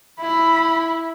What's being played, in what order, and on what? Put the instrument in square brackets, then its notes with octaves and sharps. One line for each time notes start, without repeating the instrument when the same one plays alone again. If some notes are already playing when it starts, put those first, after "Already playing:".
[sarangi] E4 [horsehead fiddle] B5